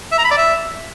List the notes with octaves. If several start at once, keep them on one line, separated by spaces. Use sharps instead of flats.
E5
A#5
B5
D5
E5